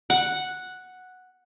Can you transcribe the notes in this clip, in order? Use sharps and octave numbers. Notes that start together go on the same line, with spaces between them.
F#5